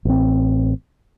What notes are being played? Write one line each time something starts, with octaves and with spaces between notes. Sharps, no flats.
A1 C4